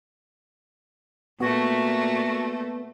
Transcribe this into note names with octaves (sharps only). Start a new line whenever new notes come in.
A#2 A3 B3 F#4